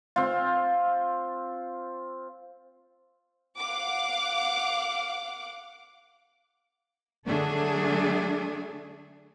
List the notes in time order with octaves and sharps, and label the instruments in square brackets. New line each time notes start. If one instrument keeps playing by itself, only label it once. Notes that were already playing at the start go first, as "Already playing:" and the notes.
[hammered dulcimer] C4 F4
[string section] F5 F#5 D6
[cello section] D3 F#3 A3 D4 G#4 A4